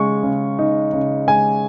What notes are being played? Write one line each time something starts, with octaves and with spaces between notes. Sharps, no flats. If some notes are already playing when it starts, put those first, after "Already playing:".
Already playing: C#3 G#3 D#4 C#6
C#3
D#4
C#3
G#3 G#5